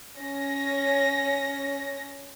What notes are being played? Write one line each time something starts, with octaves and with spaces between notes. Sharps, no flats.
C#4 A#6